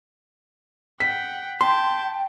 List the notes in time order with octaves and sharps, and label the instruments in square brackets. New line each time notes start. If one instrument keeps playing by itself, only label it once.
[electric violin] F#5 G5 [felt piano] B6
[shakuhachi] G5 [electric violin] A5 G6 [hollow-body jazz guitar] C6